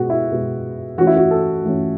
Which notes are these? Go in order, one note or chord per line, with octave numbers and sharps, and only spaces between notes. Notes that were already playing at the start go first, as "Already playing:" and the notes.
Already playing: B2 G#3 B3 F#4
E4
B2 G#3 B3
E3 A3 C#4 F#4
E4
F#4
A4
E3 A3 C#4